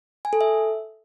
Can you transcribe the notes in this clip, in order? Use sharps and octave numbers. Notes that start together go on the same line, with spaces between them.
G#5
A4
E5